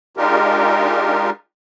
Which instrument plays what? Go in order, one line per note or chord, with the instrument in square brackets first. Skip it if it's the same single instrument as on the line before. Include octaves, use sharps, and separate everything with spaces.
[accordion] G#3 D4 D#4 F4 G4 A#4